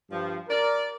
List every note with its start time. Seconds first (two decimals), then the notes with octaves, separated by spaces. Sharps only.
0.10 G2 F3
0.49 A#4 D5